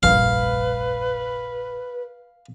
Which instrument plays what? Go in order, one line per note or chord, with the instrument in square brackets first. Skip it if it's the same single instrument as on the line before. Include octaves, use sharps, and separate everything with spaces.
[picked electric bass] F1 A#1 G2 [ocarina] B4 [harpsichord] F5